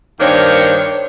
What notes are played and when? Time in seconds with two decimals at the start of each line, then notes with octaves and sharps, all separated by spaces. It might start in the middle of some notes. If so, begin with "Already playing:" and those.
0.20 G2 D#3 A#3 D4 C5 C#5